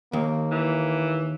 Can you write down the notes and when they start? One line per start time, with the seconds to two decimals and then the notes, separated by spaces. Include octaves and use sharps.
0.13 D#2 A#3
0.52 E3